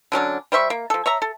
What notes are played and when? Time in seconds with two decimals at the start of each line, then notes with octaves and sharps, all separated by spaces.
0.12 D3 F#3 C#4 D4
0.52 G3 C5 E5 C#6
0.70 A#3
0.90 F3 A4
1.06 C#5 E5 A#5
1.22 A4